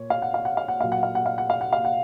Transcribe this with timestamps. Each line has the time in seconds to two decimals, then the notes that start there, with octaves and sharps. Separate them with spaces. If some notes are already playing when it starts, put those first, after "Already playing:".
Already playing: A#2 C#5
0.10 F5
0.22 F#5
0.34 F5
0.45 F#5
0.57 F5
0.68 F#5
0.81 A#2 F#3 F5
0.92 F#5
1.03 F5
1.15 F#5
1.26 F5
1.38 F#5
1.50 F5
1.61 F#5
1.73 F5
1.85 F#5